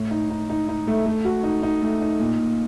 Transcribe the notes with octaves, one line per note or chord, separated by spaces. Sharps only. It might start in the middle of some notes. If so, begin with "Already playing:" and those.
Already playing: A2
D#4
D#4
D#4
D#4
A3
A3
F#4
D#4
D#4
A3
D#4
A#2
A#2